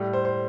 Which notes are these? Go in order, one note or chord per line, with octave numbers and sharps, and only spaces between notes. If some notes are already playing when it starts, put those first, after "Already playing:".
Already playing: A2 G3
C5
C5